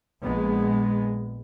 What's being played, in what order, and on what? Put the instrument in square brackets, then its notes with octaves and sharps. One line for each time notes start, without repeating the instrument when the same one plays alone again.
[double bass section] A#1 G#3 B3